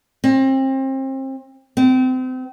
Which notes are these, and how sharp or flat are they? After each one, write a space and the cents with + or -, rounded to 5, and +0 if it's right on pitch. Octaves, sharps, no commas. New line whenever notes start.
C4 +30
C4 -30